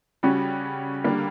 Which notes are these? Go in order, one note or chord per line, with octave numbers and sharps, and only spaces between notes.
C#3 G3 C#4 F#4
D3 G3 A#3